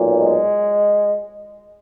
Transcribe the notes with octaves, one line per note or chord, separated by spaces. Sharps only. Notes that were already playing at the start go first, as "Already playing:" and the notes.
Already playing: B1 A#2
G#3